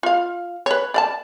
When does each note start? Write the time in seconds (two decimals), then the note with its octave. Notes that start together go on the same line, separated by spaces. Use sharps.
0.03 F4 F5
0.66 B4 C#5
0.94 D5 F5 A5